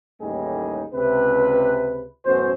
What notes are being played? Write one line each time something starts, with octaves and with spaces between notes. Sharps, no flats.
A1 D#2 A2 G3 D#4 G#4
C#2 C3 B4
A1 F#2 B2 F#4 C5